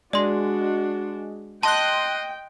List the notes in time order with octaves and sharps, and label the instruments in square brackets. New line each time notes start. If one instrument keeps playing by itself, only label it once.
[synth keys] G#3 [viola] D4 F#4 [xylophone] D5 C6
[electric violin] D#5 [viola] G5 [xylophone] A5 [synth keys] C6 F#6